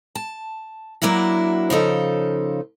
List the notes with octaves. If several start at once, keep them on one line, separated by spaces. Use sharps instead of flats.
A5
F#3 A#3 D4 E4 F#4
C#3 F3 D#4 A4